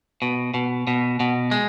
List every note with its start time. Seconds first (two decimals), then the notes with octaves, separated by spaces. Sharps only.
0.22 B2
0.54 B2
0.87 B2
1.20 B2
1.51 G#3